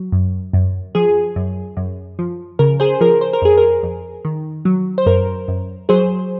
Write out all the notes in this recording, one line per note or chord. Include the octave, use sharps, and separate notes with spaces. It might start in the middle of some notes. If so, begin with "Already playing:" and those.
Already playing: F#3
F#2
F#2
F3 G#4
F#2
F#2
F3
C#3 A#4
G#4 C5
F3 A#4
C5
A#4
F2 G#4
A#4
F2
D#3
F#3
C5
F#2 A#4
F#2
F#3 G#4 C5